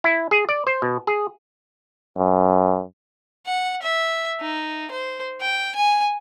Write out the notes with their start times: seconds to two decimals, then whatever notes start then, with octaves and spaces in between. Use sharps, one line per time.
0.04 E4
0.31 G#4
0.49 D5
0.67 C5
0.82 B2
1.07 G#4
2.17 F#2
3.47 F#5
3.83 E5
4.41 D#4
4.91 C5
5.41 G5
5.75 G#5